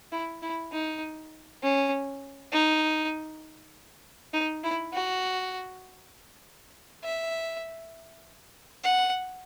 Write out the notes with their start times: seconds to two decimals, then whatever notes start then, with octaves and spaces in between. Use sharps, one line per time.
0.12 E4
0.42 E4
0.73 D#4
1.63 C#4
2.52 D#4
4.33 D#4
4.64 E4
4.93 F#4
7.04 E5
8.84 F#5